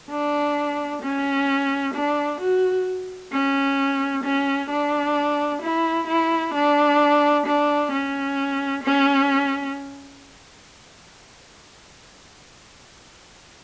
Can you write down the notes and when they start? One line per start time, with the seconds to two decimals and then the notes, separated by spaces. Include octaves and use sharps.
0.10 D4
1.03 C#4
1.94 D4
2.40 F#4
3.32 C#4
4.24 C#4
4.70 D4
5.62 E4
6.07 E4
6.54 D4
7.46 D4
7.92 C#4
8.83 C#4